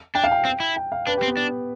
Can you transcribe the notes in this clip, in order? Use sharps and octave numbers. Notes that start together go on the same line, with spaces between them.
D4 G5
F5
G5
C4
E4
G5
F5
D4 B4
G4
C4
B3
D4